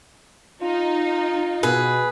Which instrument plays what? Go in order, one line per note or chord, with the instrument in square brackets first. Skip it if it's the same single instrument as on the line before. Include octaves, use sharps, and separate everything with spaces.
[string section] D#4 [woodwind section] F4
[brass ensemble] B2 [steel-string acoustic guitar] G#4 B4